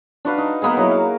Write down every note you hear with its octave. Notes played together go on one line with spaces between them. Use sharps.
D4 F#4 B4 F5
D#4
A#3 B3 D#4 G#4
F#3 E4 A#4
F5